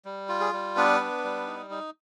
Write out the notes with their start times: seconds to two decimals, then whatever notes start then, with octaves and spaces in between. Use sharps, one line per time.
0.05 G3
0.29 F4
0.40 G#4
0.53 G3
0.77 B3 D4 B4
1.00 D4
1.24 G3
1.47 D#4
1.70 D#4